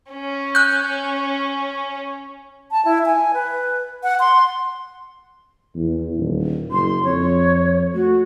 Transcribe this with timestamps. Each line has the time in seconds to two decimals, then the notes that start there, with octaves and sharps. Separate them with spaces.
0.12 C#4
0.55 F#6 G6
2.71 A5
2.85 E4
3.06 G#5
3.34 B4
4.03 F#5
4.20 C6
5.76 E2
6.18 D#1
6.71 F#1 C6
7.04 F2 C#5
7.94 A3 F#4